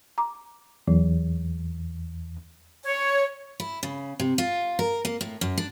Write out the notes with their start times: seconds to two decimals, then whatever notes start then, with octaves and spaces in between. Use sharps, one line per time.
0.18 A#5 D6
0.88 E2 F#3
2.84 C#5
3.60 E4
3.83 C#3
4.20 C3
4.38 F4
4.79 A#4
5.05 A#3
5.21 A2
5.41 F#2
5.58 D4